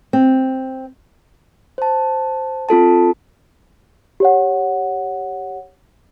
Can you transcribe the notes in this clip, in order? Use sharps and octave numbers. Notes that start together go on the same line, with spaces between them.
C4
C5 A5
C4 F4 A4 A5
G4 C#5 F#5